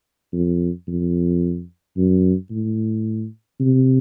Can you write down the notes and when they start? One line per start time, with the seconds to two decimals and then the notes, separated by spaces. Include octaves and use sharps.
0.33 F2
0.88 F2
1.97 F#2
2.50 A2
3.60 C3